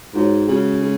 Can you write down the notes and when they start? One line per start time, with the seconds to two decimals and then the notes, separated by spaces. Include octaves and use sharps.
0.14 G#2 G#3 F#4 C#5
0.47 C#3 G#3 F#4 C#5
0.81 G#3